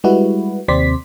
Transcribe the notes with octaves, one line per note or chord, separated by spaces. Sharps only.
G3 G#3 E4 F#4 B4
D#2 C3 C4 D5 C6 B6